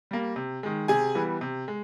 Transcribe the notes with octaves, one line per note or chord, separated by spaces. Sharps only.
G3 A#3
C3
D#3 G#3
C3 G#4 G#5
E3 G3 B3
C3
G#3